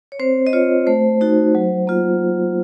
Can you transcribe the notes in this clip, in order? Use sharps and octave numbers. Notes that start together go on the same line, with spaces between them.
C#5
C4 C5
D#5
F4 C#5
A3 C5
D#4 F#4
F#3
A#3 F4